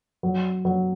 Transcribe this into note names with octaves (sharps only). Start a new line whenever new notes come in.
F#3
F#3